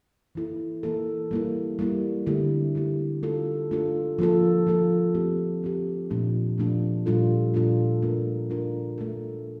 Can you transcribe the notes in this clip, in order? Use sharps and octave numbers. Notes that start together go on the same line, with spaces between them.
E3 A#3 E4 A4
E3 A#3 E4 A4
G3 A#3 E4
G3 A#3 E4
D3 A3 E4 G4
D3 A3 E4 G4
A3 D4 F4 A4
A3 D4 F4 A4
F3 A#3 F4 A4
F3 A#3 F4 A4
A3 C4 G4
A3 C4 G4
A#2 F3 A3 D4 F4
A#2 F3 A3 D4 F4
A#2 G3 D4 F4 A4
A#2 G3 D4 F4 A4
A3 D4 F4 A#4
A3 D4 F4 A#4
A3 D4 A4